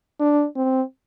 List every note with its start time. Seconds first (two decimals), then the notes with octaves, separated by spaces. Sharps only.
0.20 D4
0.56 C4